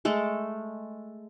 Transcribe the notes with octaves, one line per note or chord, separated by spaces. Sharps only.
G#3 A3 A4